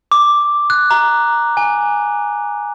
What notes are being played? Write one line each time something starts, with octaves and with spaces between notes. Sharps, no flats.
D6
F#6
A#5
G#5